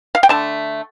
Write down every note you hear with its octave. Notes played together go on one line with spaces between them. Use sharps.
F5
G5
D3 A3 A5